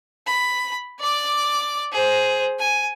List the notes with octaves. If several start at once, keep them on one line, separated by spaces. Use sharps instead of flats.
B5
D5 D6
G#4 C5
G#5